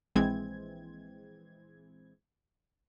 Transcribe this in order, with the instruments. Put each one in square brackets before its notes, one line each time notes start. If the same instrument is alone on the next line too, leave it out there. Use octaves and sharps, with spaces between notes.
[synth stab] A#1 E3 G#3 C4 G#6